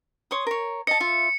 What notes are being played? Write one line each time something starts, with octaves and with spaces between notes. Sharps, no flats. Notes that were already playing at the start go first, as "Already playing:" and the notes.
C#5 C6 D#6
A#4 C#5
D#5 A5 C#7
F4 E5